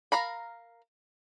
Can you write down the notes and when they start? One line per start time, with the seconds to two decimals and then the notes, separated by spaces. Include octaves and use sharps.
0.12 A#4 F5 A#5 B5